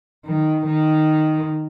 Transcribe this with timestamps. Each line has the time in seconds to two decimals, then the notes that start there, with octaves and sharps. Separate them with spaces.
0.25 D#3
0.66 D#3